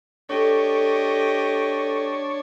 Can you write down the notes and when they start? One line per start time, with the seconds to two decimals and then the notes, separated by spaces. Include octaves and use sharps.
0.29 D4 G4 A4 C#5 D#5